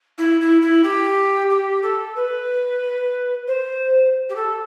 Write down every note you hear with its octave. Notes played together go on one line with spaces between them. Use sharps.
E4
E4
E4
G4
G4
A4
B4
C5
G4
A4